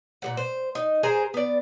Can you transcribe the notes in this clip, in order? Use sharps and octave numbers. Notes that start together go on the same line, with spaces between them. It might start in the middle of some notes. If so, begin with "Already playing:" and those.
A#2 G#3 F#5
C5
D#4
G#4 A#4 C5 G#5
B3 D5